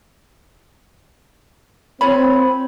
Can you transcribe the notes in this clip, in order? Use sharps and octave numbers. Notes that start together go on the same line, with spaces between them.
C4 F4 C#5 B5